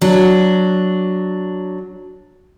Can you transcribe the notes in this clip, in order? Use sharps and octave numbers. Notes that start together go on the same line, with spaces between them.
F#3 D4